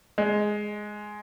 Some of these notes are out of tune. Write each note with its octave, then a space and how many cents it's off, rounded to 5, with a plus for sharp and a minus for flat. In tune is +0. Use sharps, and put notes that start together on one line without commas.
G#3 +5